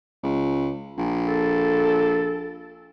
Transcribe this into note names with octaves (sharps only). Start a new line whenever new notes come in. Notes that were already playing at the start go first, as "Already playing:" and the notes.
C#2
A#1
A4